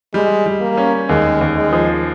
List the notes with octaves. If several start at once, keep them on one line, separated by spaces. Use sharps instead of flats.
G3 G#3
G3
A#3
C#4
D#2 G#3
D#2
G#3
F3